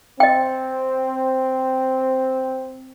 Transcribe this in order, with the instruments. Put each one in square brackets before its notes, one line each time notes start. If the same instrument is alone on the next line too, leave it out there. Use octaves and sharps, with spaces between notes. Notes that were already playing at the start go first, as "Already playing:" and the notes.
[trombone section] C4 [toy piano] D#5 G5